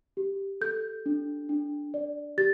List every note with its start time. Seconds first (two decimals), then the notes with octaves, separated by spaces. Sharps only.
0.17 G4
0.61 A4 G6
1.06 D4
1.49 D4
1.94 D5
2.38 G4 A6